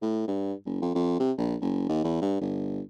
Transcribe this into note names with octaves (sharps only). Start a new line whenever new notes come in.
A2
G2
F#1
F2
F2
C3
A#1
F#1
D#2
E2
G2
G1